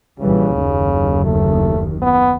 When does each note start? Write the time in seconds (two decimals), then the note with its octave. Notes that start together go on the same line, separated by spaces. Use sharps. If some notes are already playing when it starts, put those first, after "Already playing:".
0.20 A#1 C#3 E3 G3
0.59 F#1 D#2 D#3
1.24 A3
2.02 B3